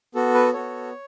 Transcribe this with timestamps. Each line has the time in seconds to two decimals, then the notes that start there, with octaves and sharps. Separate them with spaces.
0.15 B3 F#4 A4
0.34 B4
0.53 B3 F#4 A4 C#5